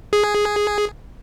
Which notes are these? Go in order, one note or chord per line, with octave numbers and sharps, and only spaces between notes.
G#4